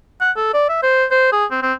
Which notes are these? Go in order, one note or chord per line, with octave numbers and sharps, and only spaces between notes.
F#5
A4
D5
E5
C5
C5
G#4
C4
C4